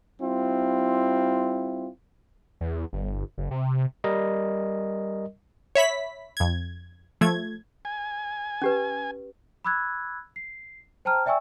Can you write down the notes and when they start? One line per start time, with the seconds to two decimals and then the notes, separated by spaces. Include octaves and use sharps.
0.21 G3 C4 E4 F4
2.61 E2
2.93 G1
3.38 F#1
3.51 C3
4.04 G3 A#4 D#5
5.75 C#5 E5 B5 B6
6.37 F2 G#6
7.21 F3 A3 G#6
7.85 G#5
8.62 C#4 G4 B4
9.65 B5 D6 E6 F#6 G#6
10.36 C7
11.05 C5 G5 A5 A#5 F6
11.26 D5 E5 G5 G#5 C#6 E6